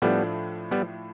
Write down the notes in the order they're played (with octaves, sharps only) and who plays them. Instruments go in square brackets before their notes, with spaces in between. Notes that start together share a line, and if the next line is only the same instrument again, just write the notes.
[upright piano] A2 F3 A3 D4 [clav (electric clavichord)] G3 B3
[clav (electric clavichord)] G3 B3